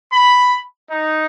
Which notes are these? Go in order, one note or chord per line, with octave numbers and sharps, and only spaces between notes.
B5
D#4